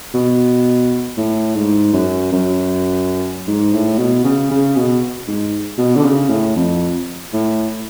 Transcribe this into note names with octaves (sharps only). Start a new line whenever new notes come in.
B2
A2
G#2
F#2
F#2
G#2
A2
B2
C#3
C#3
B2
G#2
B2
D3
C#3
A2
F2
A2